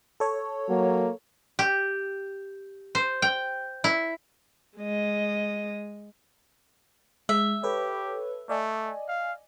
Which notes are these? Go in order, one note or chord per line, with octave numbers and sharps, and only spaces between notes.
A4 C#5
F#3 A#3
G4
C5
G5
E4
G#3 D#5
G#3 E5
G4 A4 B4 C#5
A3 D5 D#5 G#5
F5